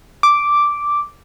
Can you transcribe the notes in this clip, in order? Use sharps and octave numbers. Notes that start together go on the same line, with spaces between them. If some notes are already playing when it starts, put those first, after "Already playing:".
D6